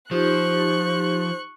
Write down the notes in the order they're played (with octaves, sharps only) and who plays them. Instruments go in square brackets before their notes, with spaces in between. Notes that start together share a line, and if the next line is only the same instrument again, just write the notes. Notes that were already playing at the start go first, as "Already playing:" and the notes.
[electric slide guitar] F3 [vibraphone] D#4 F4 G4 [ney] C5 [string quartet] C#6 F#6